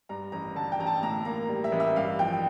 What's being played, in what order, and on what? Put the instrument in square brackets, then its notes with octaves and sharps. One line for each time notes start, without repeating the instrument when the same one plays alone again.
[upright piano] G2 A#5
A1 A#5
D3 A5
G5
A1 A#5
A5
A2 A#5
A#3 A#5
G3
E5
A1
E5
G2 F5
F3 G5